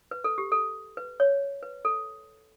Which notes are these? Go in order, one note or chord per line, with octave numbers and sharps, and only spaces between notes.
B4
A4
G4
A4
B4
C#5
B4
A4